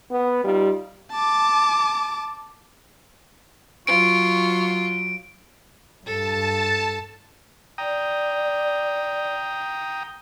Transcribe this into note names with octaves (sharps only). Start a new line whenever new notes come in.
B3
G3 D#4 F4
A5 D6
F#3 F4 C#6 D7
G2 A4 A5
D5 G5 A#5 D#6